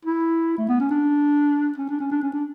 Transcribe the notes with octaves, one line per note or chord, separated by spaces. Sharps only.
E4
A3
B3
C#4
D4
C#4
D4
C#4
D4
C#4
D4